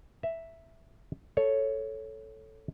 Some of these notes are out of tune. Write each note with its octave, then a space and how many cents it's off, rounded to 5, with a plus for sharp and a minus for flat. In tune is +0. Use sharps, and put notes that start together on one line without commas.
E5 +0 A#5 +0
A4 +0 C#5 +0